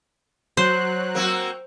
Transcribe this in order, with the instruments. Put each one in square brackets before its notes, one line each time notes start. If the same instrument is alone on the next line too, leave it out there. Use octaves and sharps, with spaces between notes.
[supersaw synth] F#3 F#6 [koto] C5
[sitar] A#3 C4 F#4